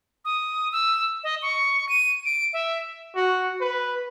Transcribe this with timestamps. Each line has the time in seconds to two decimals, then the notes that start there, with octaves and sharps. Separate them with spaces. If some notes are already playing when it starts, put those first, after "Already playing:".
0.25 D#6
0.72 E6
1.24 D#5
1.42 C#6
1.89 D#7
2.25 D7
2.53 E5
3.16 F#4
3.61 B4